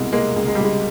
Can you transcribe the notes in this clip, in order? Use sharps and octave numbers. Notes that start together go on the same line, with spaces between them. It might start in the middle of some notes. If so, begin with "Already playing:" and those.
Already playing: C2 B2 G#3
C3 G#3 A#3
C#2
G#3
G3
C#2 G#3